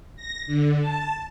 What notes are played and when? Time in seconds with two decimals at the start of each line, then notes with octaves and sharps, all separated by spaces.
0.16 A#6
0.46 D3
0.80 A5